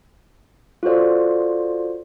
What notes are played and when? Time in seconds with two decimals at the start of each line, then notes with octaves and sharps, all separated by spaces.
0.83 F4 F#4 A4 C5 D5